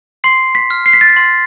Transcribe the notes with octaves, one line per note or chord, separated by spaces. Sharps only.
C6 C7
B6
F6
C7
B6
A6
B6
C6